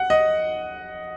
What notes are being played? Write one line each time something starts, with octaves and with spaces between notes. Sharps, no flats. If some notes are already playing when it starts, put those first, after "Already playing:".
Already playing: F#5
D#5